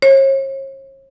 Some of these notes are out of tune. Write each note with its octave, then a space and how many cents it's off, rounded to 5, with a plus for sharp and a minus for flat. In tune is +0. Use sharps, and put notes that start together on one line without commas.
C#5 -45